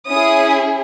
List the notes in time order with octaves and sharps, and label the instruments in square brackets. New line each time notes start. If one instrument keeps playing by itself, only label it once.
[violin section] C#4 E4 G#4 D#6